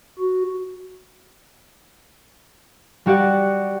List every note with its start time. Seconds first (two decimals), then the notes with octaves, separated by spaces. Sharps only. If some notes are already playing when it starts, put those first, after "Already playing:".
0.19 F#4
3.06 G3 F#4 G4 D5 F#5